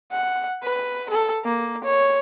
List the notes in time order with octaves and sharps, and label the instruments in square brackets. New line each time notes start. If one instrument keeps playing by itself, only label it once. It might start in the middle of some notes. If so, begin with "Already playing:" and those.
[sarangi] F#5
B4
A4
A#3
C#5